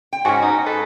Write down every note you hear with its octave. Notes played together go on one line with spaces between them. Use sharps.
G5
G#2 C#4 F#4 G#5
D#4
A4 B4